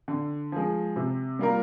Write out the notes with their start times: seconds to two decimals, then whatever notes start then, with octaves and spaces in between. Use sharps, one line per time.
0.08 D3
0.52 F3 G#3
0.96 C3
1.39 G3 A#3 F4 A#4